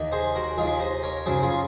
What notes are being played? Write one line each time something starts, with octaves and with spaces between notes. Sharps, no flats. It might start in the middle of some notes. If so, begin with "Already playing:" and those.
Already playing: D#2 D#3
G#4 C5
F#4 A#4
D#2 D#3 F4 G#4
C5 D#5
A#4 C#5
F#2 C#3 G#4 C5
F4 G#4